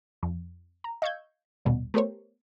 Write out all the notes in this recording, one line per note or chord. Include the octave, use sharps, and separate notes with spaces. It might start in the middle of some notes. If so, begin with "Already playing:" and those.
F2
A#5
D#5 F5 C#6 E6 G6 G#6
A#1 D#2 B2 G3
A3 B3 G4 A#4 C5 C#5